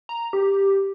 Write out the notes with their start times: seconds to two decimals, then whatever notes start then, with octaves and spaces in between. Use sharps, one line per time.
0.09 A#5
0.33 G4